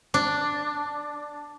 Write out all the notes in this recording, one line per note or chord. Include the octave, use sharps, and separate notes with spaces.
D4